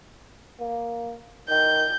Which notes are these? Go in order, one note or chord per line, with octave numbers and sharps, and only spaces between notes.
A#3
D#3 G6